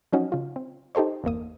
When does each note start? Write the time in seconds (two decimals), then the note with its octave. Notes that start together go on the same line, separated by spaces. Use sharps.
0.12 F3 F#3 C#4 D#4 F#4 D#5
0.32 C#3 F4
0.56 C4
0.95 D#4 G4 A4 C5 C#5
1.24 G1 E2 A#3 D#6